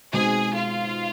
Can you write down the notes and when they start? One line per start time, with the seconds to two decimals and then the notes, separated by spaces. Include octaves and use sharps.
0.13 B2 G#3 C4 D#4 G#4 G#5
0.55 F4 F5